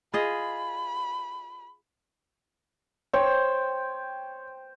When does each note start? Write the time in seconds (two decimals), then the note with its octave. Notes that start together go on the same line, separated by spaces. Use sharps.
0.14 F4 G#4 D#5 B5
3.13 C5 C#5 G5